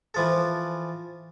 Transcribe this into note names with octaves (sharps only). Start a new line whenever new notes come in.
E3 F3 A4